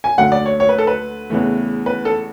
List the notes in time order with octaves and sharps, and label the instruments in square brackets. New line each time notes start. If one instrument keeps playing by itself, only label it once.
[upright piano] G#5
D2 D3 F#3 A3 F#5
D5
C#5
C#5
B4
A4
B4
E2 C#3 E3 A3
B4
A4